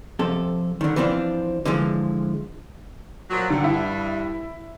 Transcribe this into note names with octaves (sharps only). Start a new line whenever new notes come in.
F2 C3 A4
D3 D#3
E3 F3 C4 D4
D3 E3 F3 G#3
A#2 F3 F#3
G2 D3
E4